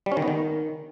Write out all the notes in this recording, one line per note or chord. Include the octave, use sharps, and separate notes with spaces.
G3
C#4
D#3
B3
D#3